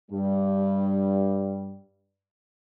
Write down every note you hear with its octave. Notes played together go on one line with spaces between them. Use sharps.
G2 G3